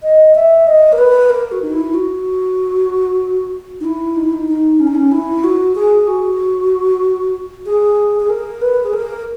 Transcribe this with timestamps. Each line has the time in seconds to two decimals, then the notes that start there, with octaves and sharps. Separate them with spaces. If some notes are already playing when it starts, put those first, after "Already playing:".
0.03 D#5
0.35 E5
0.67 D#5
0.92 A#4
0.98 B4
1.30 A#4
1.52 F#4
1.62 D#4
1.73 E4
1.94 F#4
3.81 D#4
3.85 E4
4.16 D#4
4.24 E4
4.33 D#4
4.48 D#4
4.80 C#4
4.87 D#4
4.95 C#4
5.12 E4
5.44 F#4
5.75 G#4
6.07 F#4
7.66 G#4
8.20 G#4
8.30 A#4
8.62 B4
8.84 G#4
8.93 A#4